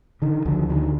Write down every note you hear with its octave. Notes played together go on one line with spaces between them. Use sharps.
D3 D#3
D2 D3 F3
D3 D#3